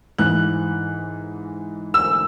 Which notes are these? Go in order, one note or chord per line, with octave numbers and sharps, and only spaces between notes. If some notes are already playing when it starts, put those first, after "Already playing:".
G#2 E3 F#6
E6